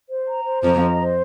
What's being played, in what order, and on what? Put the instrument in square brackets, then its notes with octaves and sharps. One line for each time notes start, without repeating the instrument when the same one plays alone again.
[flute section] C5
A#5
C5
[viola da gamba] F2 F3 [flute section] A#5
[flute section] D#5
C5